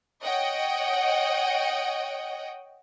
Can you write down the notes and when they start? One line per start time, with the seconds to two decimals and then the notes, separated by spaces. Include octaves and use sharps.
0.25 C#5 D#5 F#5 G5